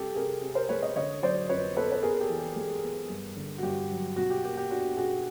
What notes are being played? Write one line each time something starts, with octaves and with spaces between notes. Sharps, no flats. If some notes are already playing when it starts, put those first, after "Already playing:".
Already playing: C2 G4 A4
C3 G#4 A#4
C3
A#4 C5
G#3 B4 C#5
C#5 D#5
D3 C#5 D#5
F#3 C5 D5
F2 B4 C#5
B3 A4 B4
B4
B3 G#4 A#4
A#4
G4 A4
E3
G4
G#3
B3
G2
D3
F#4
G2 G4
F#3
B2 F#4
G4
A#3 G4
G4
D4 F#4
B2 F#4 G#4